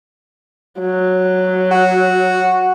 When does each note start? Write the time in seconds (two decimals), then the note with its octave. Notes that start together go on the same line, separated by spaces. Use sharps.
0.79 F#3
1.71 F#4